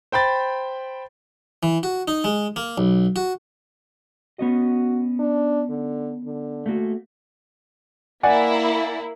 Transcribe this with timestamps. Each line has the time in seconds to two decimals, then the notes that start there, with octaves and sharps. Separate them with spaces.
0.12 C5 G5 B5 A6
1.63 E3
1.83 F#4
2.08 D#4
2.24 G#3
2.56 A#3
2.78 B1
3.16 F#4
4.39 B3 C#4 F#4 D#5
5.19 D4
5.70 D3
6.25 D3
6.66 A3 A#3 F#4
8.23 A#3 E4 D5 F#5 G#5